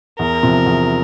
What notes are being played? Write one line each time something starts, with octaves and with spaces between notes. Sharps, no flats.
E2 A#4
C3 F3
E2